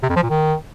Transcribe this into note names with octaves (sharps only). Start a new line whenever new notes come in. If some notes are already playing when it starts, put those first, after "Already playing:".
C3
F2
F3
A#2
D#3